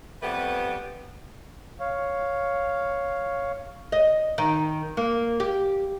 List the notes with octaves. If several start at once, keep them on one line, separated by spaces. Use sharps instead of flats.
F2 G3 A3 B3 G4 B4
C#5 F5
D#5
D#3
A#3
G4